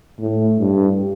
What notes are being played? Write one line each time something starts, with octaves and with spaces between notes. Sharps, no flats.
A2
G2